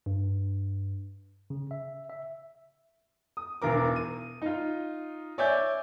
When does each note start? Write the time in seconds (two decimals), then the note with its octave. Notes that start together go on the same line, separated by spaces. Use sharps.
0.06 G2
1.50 C#3
1.71 E5
2.10 E5
3.37 D#6
3.62 E1 B1 E3 A#4 D6
3.96 D#7
4.42 D#4 F4
5.38 C#5 D5 E5 G#5 D6 G6